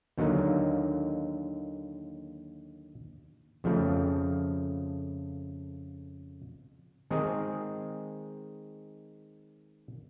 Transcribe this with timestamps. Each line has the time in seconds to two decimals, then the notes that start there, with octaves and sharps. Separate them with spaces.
0.18 D#2 D3 F#3 A#3 D#4
3.64 F2 C#3 F3 A3
7.10 D#3 G#3 C4 D#4 G#4